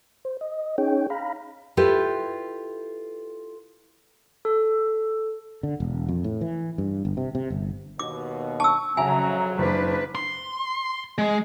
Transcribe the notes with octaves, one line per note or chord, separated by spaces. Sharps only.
C5
D#5
C#4 D#4 G#4 C#5 G5
F5 A#5 B5
E4 F4 G4 A4 B4
A4
D3
E1
F2
A2
E3
G2
G1
C3
C3
G1
D#2 B2 D6
A5 C#6 E6
F2 C#3 F#3 E5 G#5 A#5
F#1 D4 B4
C6
G#3